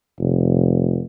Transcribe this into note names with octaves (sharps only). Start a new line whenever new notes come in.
F1